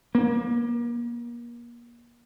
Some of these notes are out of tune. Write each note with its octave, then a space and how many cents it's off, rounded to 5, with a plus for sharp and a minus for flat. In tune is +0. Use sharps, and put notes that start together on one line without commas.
A#3 +30